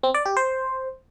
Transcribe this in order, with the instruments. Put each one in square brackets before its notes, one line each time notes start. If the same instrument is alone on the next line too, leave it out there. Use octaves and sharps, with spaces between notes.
[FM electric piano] C4
D5
G4
C5